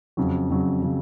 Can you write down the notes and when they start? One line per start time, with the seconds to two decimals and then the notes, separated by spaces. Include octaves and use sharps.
0.17 F2 C#3 F#3
0.50 F2 C#3 F#3
0.82 C#3 F#3